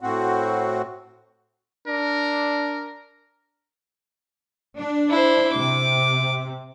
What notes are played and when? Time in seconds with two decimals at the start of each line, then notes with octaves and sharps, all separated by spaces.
0.01 A2 C4 F#4
1.87 D4 A#4
4.77 D4
5.09 E4 C5
5.52 C3 D6